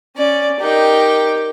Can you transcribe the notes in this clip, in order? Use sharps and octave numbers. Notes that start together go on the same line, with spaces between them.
C#4 D5
D#4 G4 A#4 G5